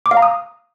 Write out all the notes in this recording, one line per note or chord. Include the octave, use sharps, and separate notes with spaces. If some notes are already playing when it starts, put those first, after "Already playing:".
D6
F5
A#5
D#6